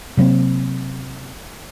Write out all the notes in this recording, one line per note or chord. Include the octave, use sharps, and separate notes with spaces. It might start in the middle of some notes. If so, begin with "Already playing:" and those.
C3 F#3 A#3 C4